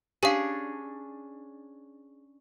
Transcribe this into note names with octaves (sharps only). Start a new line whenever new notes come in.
C#4 D4 G4 G#4 F5